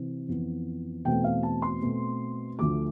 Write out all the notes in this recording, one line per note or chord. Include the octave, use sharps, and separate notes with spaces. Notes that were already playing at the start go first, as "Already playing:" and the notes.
Already playing: C3 E3
F2 E3 B3
E2 B2 A3 C4 G5
F5
A5
C6
B2 A3 C4
D2 D3 F3 A3 D6